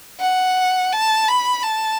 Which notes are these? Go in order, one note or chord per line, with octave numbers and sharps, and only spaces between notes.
F#5
A5
B5
A5